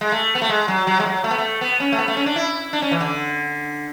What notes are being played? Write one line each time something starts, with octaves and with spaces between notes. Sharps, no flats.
G#3
A3
B3
A3
G#3
F#3
F#3
G#3
F#3
A3
B3
A3
B3
C#4
A3
B3
A3
C#4
D4
E4
D4
C#4
E3
D3